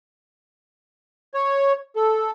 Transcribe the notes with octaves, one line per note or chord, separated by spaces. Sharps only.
C#5
A4